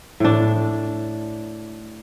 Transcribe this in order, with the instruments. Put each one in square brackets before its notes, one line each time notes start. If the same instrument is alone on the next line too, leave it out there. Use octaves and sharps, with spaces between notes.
[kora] A2 D4